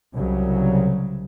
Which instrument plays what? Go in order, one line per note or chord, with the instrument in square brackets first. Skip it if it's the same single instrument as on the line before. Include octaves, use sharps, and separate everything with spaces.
[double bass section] C2 C#3 F#3